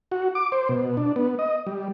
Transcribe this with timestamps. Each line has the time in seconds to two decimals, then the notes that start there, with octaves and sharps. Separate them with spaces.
0.12 F#4
0.35 D6
0.52 C5
0.69 B2
0.97 D4
1.16 B3
1.39 D#5
1.67 G3